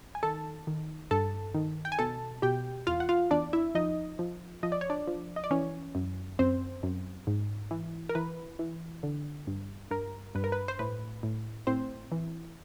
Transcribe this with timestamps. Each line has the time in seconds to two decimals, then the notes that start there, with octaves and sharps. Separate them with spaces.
0.15 G#5
0.23 D#3 A4 A5
0.67 D#3
1.11 G2 A4 A5
1.54 D#3
1.85 G5
1.92 G#5
1.99 B2 A4 A5
2.42 B2 G4 G5
2.87 E2 F4 F5
3.00 F#5
3.09 F4 F5
3.31 E2 D4 D5
3.53 E4 E5
3.75 F3 D#4 D#5
4.19 F3
4.63 F3 D#5
4.72 D5
4.81 C#5
4.90 D4 D5
5.08 F3
5.36 D#5
5.44 D5
5.51 E3 C#4 C#5
5.95 F#2
6.39 F#2 C4 C5
6.83 F#2
7.27 G#2
7.71 E3
8.09 A#4
8.15 E3 B4
8.59 E3
9.03 D3
9.47 G2
9.91 G2 A#4
10.35 G2 B4
10.44 A#4
10.52 B4
10.68 C5
10.79 A2 B4
11.23 A2
11.67 A2 C4 C5
12.12 E3